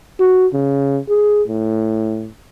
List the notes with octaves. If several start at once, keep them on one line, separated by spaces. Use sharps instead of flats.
F#4
C#3
G#4
A2